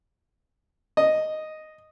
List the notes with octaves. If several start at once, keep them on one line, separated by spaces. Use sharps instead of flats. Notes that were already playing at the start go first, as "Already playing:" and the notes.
D#5